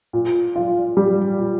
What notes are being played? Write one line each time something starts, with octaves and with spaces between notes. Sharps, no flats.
A#2
F4
G3
A#2